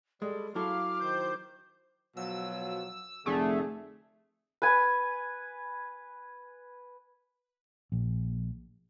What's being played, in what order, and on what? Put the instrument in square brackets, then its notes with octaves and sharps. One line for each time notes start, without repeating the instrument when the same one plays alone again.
[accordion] G3 [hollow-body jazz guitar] G#3 [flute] A4
[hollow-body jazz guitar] F#3 E4 A4 [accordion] F5 F6 [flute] D6
[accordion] D#3 C5 G6
[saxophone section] B2 F3 F#3 [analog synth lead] E6
[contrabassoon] F1 [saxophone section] D3 G#4 [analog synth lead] A3
[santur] B4 G#5
[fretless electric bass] A#1